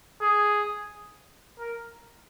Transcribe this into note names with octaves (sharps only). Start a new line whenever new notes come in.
G#4
A#4